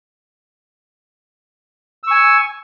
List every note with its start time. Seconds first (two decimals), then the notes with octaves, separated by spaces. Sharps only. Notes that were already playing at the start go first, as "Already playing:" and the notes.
2.03 E6
2.07 C#6
2.11 G#5